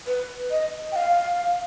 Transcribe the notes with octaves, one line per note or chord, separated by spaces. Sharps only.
B4
D#5
G5
F5